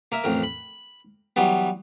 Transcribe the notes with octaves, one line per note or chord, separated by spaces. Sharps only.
A#3 A#4 E5
A1 F2 A#4
B5
E3 F#3 G3 B3